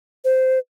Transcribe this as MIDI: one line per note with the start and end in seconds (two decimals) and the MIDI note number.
0.24 0.59 72